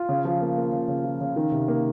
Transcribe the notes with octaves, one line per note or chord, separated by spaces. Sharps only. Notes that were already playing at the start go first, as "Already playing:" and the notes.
Already playing: F4
C#3
F3
A#3
A#3
C#3
C#3
F3
C#3
D#3
C3
A#3